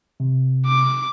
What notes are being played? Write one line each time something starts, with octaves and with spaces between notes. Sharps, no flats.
C3
D6